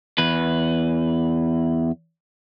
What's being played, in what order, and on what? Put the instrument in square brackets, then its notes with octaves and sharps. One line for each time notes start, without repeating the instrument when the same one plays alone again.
[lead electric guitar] E2 B4